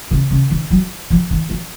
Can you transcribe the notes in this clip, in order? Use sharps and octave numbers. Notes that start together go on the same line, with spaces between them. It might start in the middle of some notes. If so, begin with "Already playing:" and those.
C#3
C#3
D#3
F#3
F3
D#3
F3